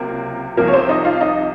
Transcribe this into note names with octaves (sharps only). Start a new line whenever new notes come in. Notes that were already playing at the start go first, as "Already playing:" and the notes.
Already playing: C#2 C3 F#3 A#3
C2 C3 F3 A#3 A#4
C#5
C4 C5
D#4 D#5
F4 F5
D#4 D#5